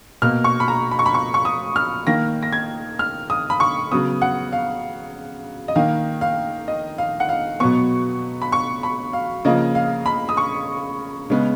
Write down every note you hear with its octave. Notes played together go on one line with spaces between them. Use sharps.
B2 A#3 F6
C#6
B5
A#5
B5
C#6
B5
C#6
C#6
D#6
F6
D#3 A#3 A#6
A#6
G#6
F6
D#6
B5
C#6
C#3 F#3 B3 D#6
F#5
F5
D#5
D#3 A#3 F5
F5
D#5
F5
F#5
F5
B2 F#3 B3 C#6
B5
C#6
B5
F5
C#3 F3 A#3 D#5
F5
B5
D#6
C#6
C#3 G#3 B3